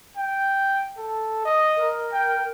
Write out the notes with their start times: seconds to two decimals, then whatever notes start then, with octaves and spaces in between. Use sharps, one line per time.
0.17 G5
0.97 A4
1.45 D#5
1.77 A#4
2.12 G5